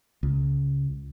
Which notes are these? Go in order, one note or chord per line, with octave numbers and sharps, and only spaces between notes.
C#2